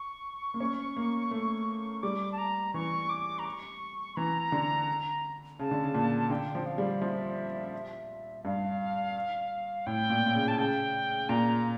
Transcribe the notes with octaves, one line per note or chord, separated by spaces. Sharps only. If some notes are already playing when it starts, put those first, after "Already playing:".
Already playing: C#6
A#3
C#4
A#3
A3
G3 D6
A5
A#5
E3 C#6
D6
A#5
C#6
E3 A#5
D3
C#3 A5
D3
C#3
A#2
D3 G5
F3
F5
G3
F3 E5
E5
G2 F5
A2 G5
A#2
A#2
C#3
A5
C#3 G5
A#2 A#5